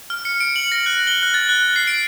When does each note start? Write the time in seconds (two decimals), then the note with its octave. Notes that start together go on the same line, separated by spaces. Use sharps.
0.10 F6
0.25 C#7
0.41 D7
0.56 F#7
0.72 A#6
0.86 F#6
1.07 G7
1.23 F#6
1.34 A6
1.49 F#6
1.76 C7
1.87 D7